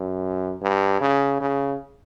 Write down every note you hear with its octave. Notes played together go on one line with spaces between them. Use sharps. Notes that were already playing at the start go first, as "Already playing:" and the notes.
Already playing: F#2
G2
C#3
C#3